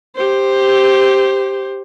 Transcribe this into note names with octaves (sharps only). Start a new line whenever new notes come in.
G4 C5